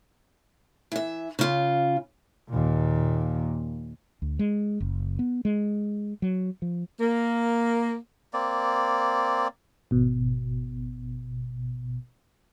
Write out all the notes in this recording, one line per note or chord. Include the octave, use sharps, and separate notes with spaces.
E3 E5
C#3 F4
D#2 A#2
D2
G#3
F#1
B3
G#3
F#3
F3
A#3
A#3 C4 D5
G#1 B2